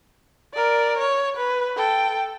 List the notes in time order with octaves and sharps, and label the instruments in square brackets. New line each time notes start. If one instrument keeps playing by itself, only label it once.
[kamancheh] A#4 D5
C#5
B4
A4 G5